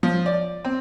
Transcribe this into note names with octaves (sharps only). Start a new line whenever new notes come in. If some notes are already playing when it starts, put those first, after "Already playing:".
F3
D5
C4